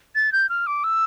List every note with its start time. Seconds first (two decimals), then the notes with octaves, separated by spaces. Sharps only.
0.15 A6
0.32 G6
0.49 F6
0.67 D6
0.84 E6